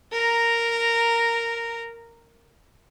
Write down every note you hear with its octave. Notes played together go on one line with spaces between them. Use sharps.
A#4 A#5